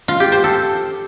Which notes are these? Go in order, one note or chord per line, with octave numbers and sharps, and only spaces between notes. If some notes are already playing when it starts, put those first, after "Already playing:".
F4
G4
C5
A4